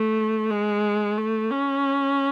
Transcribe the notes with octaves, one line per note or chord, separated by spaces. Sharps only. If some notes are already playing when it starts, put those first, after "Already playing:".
Already playing: A3
G#3
A3
C#4